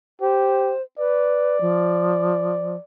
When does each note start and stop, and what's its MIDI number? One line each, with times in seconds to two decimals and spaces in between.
0.21 0.73 67
0.21 0.82 72
0.99 1.59 71
0.99 2.84 74
1.61 2.77 53